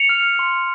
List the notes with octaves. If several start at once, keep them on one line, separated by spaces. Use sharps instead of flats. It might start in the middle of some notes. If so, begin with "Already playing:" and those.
Already playing: C#7 F7
F6
C6